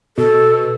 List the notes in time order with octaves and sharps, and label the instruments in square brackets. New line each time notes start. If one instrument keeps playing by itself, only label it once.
[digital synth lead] B2 [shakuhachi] A4